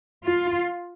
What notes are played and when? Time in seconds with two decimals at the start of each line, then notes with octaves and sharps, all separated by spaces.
0.24 F4